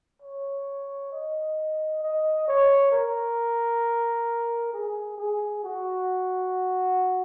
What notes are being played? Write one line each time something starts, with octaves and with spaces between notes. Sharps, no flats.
C#5
D#5
D#5
C#5
A#4
G#4
G#4
F#4